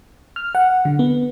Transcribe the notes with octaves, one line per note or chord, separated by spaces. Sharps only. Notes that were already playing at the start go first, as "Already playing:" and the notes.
F6
F#5
D3
B3